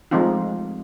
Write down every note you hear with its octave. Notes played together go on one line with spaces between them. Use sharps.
F3 G#3 A3 C4 D#4 F4